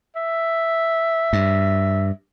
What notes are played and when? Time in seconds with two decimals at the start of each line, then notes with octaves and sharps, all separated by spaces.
0.16 E5
1.33 G2